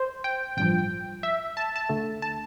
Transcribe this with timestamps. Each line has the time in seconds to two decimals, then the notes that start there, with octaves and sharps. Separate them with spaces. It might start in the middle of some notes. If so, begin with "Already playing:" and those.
Already playing: C5
0.24 G5
0.57 A1 G2 F3 G5
1.23 E5
1.57 A5
1.76 A5
1.89 D2 D3 A3
2.22 A5